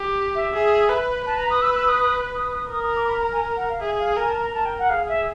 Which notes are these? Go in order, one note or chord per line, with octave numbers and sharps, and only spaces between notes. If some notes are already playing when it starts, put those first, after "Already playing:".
Already playing: G4
E5
G#4
B4
B4 A5
A#5
D#6
E6
E6
D#6
D#6
D#6
D#6
A#4 D#6
D#6
D6
B5
A#5
G#5
F#5
F5
G#4 E5
F5
A#4 G#5
A5
A#5
A#4 A5
G5
F#5
G#4 F5
E5